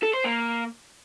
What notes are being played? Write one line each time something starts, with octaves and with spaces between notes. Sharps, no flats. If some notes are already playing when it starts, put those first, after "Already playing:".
A4
C5
A#3